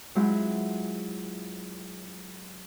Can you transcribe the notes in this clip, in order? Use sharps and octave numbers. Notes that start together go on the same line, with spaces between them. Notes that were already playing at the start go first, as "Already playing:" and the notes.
F#3 G#3 C4 E4 F4